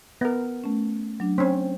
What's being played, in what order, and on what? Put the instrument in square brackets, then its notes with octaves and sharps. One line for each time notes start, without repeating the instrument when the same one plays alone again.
[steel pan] B3 A#4
[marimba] A3 C#4
F#3 D4
[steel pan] C4 C#4